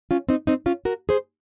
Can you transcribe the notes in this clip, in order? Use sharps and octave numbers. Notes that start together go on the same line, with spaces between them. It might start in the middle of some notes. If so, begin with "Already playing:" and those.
C#4 F4
C4 D#4
C4 D#4
C#4 F4
F#4 A#4
G#4 C5